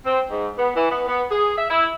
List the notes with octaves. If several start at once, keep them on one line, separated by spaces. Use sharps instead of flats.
C4
G#2
B3
E3
B3
B3
G#4
E5
E4